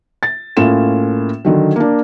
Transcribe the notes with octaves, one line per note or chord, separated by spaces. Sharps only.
A6
A2 A#3 C#4 F4 E7
D3 D#3 F#3
A#3 D4